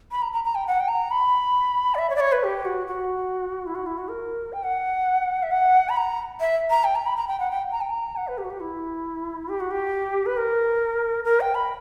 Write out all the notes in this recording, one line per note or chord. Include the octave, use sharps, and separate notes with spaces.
B5
A#5
A#5
A#5
G5
F#5
G5
A#5
B5
D5
E5
C#5
D5
C#5
B4
G4
F#4
F#4
E4
F#4
E4
F#4
A#4
G5
F#5
E5
F#5
B5
A#5
E5
A#5
G5
A#5
B5
A#5
G5
F#5
G5
A#5
G5
A#5
F#5
B4
G4
F#4
G4
E4
G4
F#4
G4
B4
A#4
A#4
G5
B5